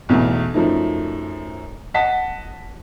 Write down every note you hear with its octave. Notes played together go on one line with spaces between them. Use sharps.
B1 E2 A3
F#2 F3 A3 D#4
D#5 F#5 A5 B6